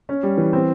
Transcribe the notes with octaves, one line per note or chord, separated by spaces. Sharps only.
C#4
G3
E3
C4